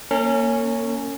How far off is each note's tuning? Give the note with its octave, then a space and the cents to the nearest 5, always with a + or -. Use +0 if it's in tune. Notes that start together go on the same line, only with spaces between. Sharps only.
A#3 +0 C#4 +0 A#4 -40